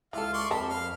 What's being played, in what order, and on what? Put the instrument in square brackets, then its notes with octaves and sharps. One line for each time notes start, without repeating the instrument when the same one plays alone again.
[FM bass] C#2 [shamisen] E3 A4 [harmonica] F4 F5
[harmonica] D5 C6 C#6
[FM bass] F2 [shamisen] A#4 A5 [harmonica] B5
[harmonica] F5